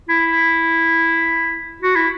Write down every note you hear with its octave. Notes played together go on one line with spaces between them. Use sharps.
E4
F#4
E4